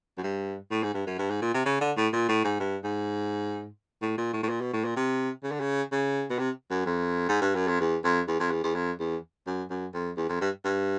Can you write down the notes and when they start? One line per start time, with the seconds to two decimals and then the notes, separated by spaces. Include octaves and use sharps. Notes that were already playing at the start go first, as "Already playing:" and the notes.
0.18 F#2
0.23 G2
0.71 A2
0.83 G#2
0.94 G2
1.07 F#2
1.19 G2
1.30 G#2
1.42 A#2
1.54 C3
1.66 C#3
1.81 D3
1.97 A2
2.13 A#2
2.28 A2
2.44 G#2
2.60 G2
2.84 G#2
4.02 A2
4.18 A#2
4.33 A2
4.43 A2
4.50 A#2
4.61 B2
4.73 A2
4.85 A#2
4.97 C3
5.44 C#3
5.52 D3
5.60 C#3
5.92 C#3
6.30 B2
6.39 C3
6.71 F#2
6.86 F2
7.29 G#2
7.42 G2
7.55 F#2
7.68 F2
7.80 E2
8.04 F2
8.28 E2
8.40 F2
8.51 E2
8.64 E2
8.75 F2
9.00 E2
9.47 F#2
9.70 F#2
9.94 F2
10.17 E2
10.29 F2
10.41 G2
10.65 G2